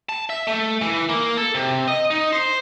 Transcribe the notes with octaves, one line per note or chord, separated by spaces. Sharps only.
A5
E5
A3
E3
A#3
A4
C3
D#5
D#4
C5